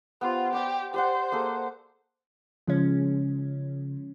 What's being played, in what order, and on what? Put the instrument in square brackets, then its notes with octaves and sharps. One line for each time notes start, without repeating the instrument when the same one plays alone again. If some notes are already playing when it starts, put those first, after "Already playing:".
[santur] B3 G4 C5 [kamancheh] F4
[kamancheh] G4 [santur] C5 D5 G5
[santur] G4 D5 F#5 [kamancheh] C5
[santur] A#3 G#4 A4
[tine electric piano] C#3 [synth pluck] F3 G#3 C#4